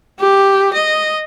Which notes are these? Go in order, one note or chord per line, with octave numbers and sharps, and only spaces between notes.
G4
D#5